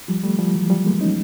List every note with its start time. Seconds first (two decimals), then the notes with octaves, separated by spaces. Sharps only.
0.08 F3 G3
0.24 G3 A3
0.39 F3 G3
0.54 E3 F#3
0.70 F3 G3
0.86 G#3 A#3
1.01 C#4 D#4